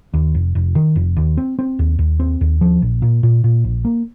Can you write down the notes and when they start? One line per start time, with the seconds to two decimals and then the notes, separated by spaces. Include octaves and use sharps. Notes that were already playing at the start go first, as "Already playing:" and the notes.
0.14 D#2
0.35 F1
0.55 F1
0.75 D#3
0.96 F1
1.16 D#2
1.37 C4
1.59 C4
1.79 D#2
1.99 D#2
2.19 C4
2.41 D#2
2.61 F3
2.82 A#1
3.02 A#2
3.23 A#2
3.44 A#2
3.64 A#1
3.85 A#3